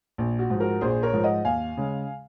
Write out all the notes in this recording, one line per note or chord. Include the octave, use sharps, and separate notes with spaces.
A#1
F#4
G#2 F3
F#4 A#4
A#1 G#4 C5
A#4 C#5
G#2 F3
D#5 F#5
D#2 F5 G#5
C#3 G#3